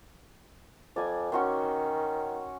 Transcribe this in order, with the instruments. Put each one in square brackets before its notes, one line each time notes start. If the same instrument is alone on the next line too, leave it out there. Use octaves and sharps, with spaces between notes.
[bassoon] F2 [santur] D5 G#5
[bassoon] D#3 [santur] C#4 F#4 C6